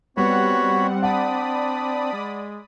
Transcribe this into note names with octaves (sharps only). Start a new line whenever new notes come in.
G3 B3 C4 F#4 C#5 F#5 B5
D4 D5 F#5 B5 D#6
G#3